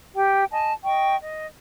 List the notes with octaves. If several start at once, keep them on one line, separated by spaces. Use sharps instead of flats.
G4 G5
D#5 G#5 A5
D#5 G5 C#6
D#5